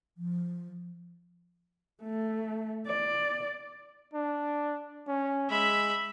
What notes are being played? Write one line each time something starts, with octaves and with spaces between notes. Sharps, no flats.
F3
A3
D5
D4
C#4
G#3 E5 B5